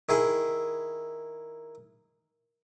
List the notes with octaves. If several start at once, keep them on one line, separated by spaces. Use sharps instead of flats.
D#3 E4 G#4